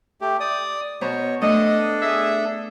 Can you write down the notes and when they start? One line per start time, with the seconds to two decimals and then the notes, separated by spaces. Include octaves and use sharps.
0.21 A3 G4
0.40 D5 D#6
1.01 B2 B3 C5 C#5 A#5
1.42 A3 D4 A4 D#5
2.01 G#4 E5